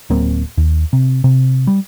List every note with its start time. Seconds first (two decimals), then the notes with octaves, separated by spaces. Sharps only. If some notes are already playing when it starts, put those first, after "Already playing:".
0.10 D1 F#3 A#3 C4
0.57 D#2
0.93 C3
1.24 C3
1.67 G3